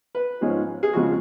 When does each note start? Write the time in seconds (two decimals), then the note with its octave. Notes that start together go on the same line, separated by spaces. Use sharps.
0.15 B4
0.41 G#2 F3 G#3 C#4
0.83 G#4
0.93 F2 C#3 F3 G#3 F#4